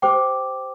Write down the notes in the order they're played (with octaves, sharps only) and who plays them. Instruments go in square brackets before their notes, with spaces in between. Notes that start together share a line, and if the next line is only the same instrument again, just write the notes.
[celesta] G4 C5 G5 D6